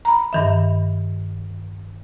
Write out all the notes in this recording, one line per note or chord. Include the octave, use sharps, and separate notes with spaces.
A#5 B5
G2 D#3 E5